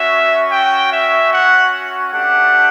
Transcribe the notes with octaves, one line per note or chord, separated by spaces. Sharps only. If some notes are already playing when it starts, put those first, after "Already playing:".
Already playing: C#4 F#4 E5
G5
E5
F#5
A3 D4 G4 F#5